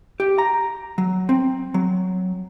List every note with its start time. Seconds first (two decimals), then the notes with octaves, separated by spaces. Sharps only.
0.20 G4
0.38 A#5
0.98 F#3
1.29 C4
1.74 F#3